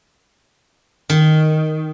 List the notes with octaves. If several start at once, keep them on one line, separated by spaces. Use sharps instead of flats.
D#3